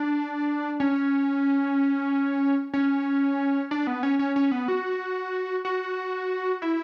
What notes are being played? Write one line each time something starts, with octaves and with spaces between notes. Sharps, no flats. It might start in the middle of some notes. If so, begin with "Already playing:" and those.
Already playing: D4
C#4
C#4
D4
B3
C#4
C#4
C#4
B3
F#4
F#4
E4